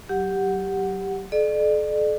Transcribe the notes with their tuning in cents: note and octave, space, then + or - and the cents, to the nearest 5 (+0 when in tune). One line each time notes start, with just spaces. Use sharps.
F#3 +20 G4 +0 F#5 +0
A4 -40 D5 +35